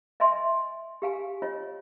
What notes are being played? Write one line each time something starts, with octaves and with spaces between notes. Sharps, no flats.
D#5 E5 G#5 C6
G4 F5 G#5
F4 C#5 D#5